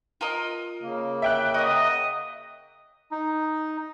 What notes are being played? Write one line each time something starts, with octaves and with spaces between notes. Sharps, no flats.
F4 A#4 D#5
C#3 A#3
E5 G5 F#6
F#4 A#4 D#5
D#4